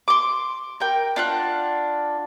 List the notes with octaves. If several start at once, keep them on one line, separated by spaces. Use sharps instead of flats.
C6 D6
A#4 G5
D4 F4 F#5